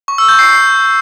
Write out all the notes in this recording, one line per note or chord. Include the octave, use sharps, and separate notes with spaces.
C#6
E6
G6
C7
C7